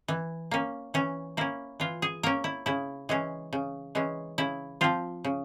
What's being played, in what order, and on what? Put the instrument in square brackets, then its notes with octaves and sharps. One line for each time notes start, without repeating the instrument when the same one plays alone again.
[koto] E3
A#3 C#4
E3 C#4
A#3 C#4 E4
E3 F4
G#4
A#3 C#4 A#4
E4
C#3 E4
E3 G#3 C#4
C#3
E3 G#3 C#4
C#3 E4
F3 C4 F4
C#3